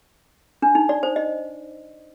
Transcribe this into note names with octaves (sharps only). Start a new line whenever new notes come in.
D4
D#4
D5
C5
D#5